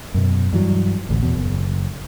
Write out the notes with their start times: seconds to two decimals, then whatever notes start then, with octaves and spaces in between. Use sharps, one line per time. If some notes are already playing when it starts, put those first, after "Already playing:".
0.14 F#2 B2
0.53 G2 E3 F#3
1.09 A1 D2
1.23 E2 B2
1.35 F#1